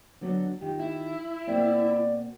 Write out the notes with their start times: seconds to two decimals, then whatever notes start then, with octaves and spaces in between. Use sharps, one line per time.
0.21 D3 F#3 B3
0.61 D#3 F4 G4
0.80 E4
1.47 B2 A#3 C4 D5